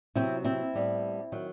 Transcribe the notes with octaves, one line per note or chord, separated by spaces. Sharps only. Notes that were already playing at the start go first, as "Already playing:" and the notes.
C3 F#3 B3 C4 E4
C4 E4
A2 G3 B3
D#3 F#3